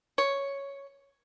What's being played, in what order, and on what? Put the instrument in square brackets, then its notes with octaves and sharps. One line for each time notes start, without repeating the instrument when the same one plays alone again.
[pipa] C#5